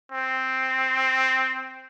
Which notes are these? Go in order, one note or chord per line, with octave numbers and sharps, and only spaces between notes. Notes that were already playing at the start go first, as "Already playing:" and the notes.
C4